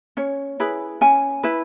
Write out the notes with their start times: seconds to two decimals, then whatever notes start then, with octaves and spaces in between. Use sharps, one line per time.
0.17 C#4 C#5
0.60 E4 G#4 B4
1.01 C#4 G#5
1.43 E4 B4